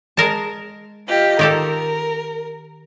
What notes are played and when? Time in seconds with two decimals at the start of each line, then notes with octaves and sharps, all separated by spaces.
0.17 G#3 A#4 A5
1.08 F4 G4 D#5
1.39 D#3 G4 A4 A#4